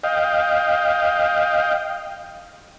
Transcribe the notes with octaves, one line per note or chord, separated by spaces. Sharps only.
D#5 F5 G5